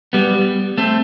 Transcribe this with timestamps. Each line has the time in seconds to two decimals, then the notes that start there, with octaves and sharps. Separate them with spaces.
0.13 G3 B3
0.78 A3 C4